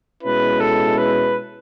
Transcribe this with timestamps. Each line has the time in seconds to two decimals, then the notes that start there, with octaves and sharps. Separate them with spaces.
0.23 B2 G#3 C#4 E4 B4
0.60 A4
0.97 B4